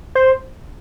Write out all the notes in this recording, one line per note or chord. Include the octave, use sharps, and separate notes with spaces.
C5